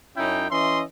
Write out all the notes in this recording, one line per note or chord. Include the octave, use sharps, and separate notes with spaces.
F#2 C#4 D#4 E4 G5
E3 C#4 D#5 E5 C6